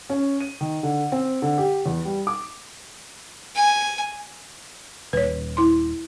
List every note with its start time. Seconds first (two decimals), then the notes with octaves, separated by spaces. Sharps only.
0.10 C#4
0.41 D#7
0.61 D#3
0.83 D3
1.12 C4
1.42 D3
1.58 G4
1.86 E2
2.05 G3
2.27 D6
3.56 G#5
5.13 D#1 B4 C#5
5.57 E4 C6